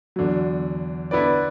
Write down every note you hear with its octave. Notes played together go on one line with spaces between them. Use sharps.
E2 D3 F#3
D3 B3 E4 B4 D5